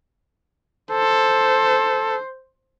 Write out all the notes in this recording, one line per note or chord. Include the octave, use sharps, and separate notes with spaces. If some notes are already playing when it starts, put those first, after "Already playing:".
A4 C5